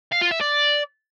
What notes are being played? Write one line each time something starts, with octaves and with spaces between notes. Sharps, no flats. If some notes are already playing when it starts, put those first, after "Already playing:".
F5
F4
E5
D5